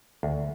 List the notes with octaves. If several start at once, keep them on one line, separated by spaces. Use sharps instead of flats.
D2